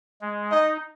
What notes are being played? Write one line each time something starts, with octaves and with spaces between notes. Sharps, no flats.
G#3
D#4 D#5